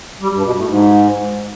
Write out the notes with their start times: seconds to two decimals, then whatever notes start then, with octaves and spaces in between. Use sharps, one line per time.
0.21 G3
0.32 G2
0.44 B2
0.55 A2
0.67 G#2